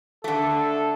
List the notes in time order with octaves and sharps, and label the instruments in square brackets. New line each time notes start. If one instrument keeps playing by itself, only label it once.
[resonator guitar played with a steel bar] D3 A3 [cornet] A4